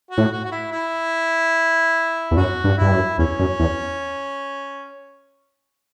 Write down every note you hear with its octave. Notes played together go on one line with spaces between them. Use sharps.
F#4
A2
F#4
F#4
E4
E4
E2
F#2 F#4
G2
G2 E4
F#2
E2 C#4
F#2
E2